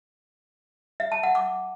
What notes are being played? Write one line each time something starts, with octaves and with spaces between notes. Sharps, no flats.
E5
A5
F#5
D6